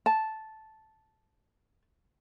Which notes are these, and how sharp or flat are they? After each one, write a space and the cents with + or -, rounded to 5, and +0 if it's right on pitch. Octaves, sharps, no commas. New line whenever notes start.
A5 -5